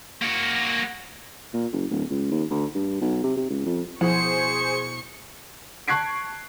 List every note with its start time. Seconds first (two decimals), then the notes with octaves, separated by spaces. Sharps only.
0.22 A#3 F#4
1.54 A#2
1.72 F#1
1.91 D1
2.11 C#2
2.32 D#2
2.50 D2
2.75 G2
3.01 B1
3.24 C3
3.37 C3
3.50 C#2
3.66 F2
4.01 B2 F3 E4 G#4 C5 F#5 C#6 C#7
5.88 A5 C#6 F#6 G#6 C7 D7